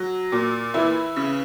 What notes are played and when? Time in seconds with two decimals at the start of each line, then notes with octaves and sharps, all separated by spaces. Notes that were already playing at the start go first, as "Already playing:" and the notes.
Already playing: F#3
0.32 A#2
0.74 E3 E4
1.16 C#3